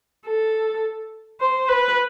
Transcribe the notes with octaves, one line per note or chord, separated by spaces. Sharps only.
A4
C5
B4